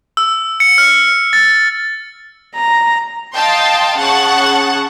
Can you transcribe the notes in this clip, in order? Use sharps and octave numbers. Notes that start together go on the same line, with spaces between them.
E6
C#7
F6
A6
A#5
D#5 F5 G5 A5 C6
C#3 F#5 A5 C#6